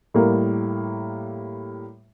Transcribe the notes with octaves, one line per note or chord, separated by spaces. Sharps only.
A2 G3 A#3